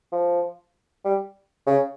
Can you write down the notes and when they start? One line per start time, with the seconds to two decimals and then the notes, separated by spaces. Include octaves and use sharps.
0.12 F3
1.04 G3
1.67 C#3